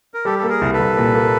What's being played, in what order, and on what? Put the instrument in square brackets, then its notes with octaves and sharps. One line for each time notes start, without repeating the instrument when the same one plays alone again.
[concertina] A#4
[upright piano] G3 [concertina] G4 A4
[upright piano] A#3 [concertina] A4
[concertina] G#4 A#4
[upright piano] C2
[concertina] A4 B4
[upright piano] C2
A#2
A#3